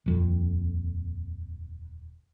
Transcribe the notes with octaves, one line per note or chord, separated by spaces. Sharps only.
D#1 F2